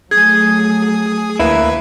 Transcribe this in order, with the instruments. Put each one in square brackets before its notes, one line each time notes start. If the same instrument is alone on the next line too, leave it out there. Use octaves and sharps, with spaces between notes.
[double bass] F#3 A3 [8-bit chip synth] G#4 D#6 [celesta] G#6
[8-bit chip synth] D2 B4 G#6 [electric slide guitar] A#3 E4